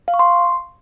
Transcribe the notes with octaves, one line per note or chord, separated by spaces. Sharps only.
F5
C#6
C6